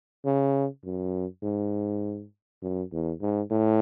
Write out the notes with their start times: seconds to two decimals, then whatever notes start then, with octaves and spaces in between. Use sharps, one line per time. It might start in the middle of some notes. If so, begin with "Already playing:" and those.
0.25 C#3
0.84 F#2
1.43 G#2
2.62 F#2
2.92 E2
3.21 G#2
3.51 A2